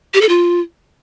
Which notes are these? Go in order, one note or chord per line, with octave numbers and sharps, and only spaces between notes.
G4
A4
F4